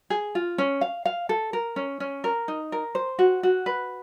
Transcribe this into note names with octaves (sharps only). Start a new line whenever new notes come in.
G#4
F4
C#4
F5
F5
A4
A#4
C#4
C#4
A#4
D#4
A#4
C5
F#4
F#4
B4